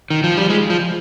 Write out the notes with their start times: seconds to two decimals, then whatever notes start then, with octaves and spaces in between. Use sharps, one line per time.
0.10 D#3
0.24 F3
0.37 G3
0.50 G#3
0.70 F3